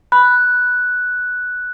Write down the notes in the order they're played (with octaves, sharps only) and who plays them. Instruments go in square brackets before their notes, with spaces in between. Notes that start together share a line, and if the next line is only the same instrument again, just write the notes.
[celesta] B5 [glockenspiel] F#6